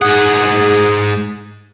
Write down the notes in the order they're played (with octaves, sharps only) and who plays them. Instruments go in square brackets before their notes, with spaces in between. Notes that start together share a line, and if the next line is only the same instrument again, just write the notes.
[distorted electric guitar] G#2 F#5 [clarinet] G#4